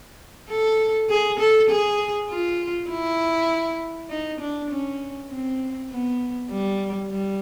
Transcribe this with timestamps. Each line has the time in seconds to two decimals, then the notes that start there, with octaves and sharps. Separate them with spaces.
0.49 A4
1.09 G#4
1.39 A4
1.70 G#4
2.29 F4
2.90 E4
4.10 D#4
4.40 D4
4.70 C#4
5.31 C4
5.90 B3
6.51 G3
7.11 G3